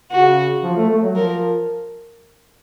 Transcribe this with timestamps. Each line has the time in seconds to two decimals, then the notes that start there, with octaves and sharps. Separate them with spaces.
0.11 C#3 F#4
0.63 F3
0.77 A3
0.90 A3
1.02 F#3
1.15 F3 A#4